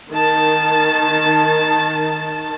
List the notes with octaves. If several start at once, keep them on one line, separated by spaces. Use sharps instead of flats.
D#3 A5